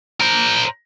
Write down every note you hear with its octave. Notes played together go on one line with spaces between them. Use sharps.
A#4 C5